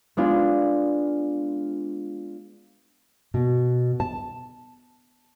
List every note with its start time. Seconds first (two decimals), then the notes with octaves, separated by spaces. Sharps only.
0.17 G#3 B3 D4 F4
3.34 B2
4.00 A5